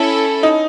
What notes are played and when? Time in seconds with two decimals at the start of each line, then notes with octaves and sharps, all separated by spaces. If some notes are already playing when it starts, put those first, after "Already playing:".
Already playing: C#4 E4 A4
0.43 D#4